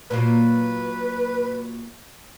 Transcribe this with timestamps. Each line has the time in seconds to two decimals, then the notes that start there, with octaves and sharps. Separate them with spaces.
0.11 A#2 F#3 A#3 B4